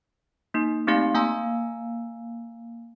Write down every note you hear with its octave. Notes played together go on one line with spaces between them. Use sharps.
A#3 D#4
A3 C4 D#4 G4 F5
A#3 F5 G#5 A#5 E6